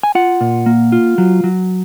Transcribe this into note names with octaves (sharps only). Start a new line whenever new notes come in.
G#5
F4 F#5
A#2
A#3
F4
F#3
F#3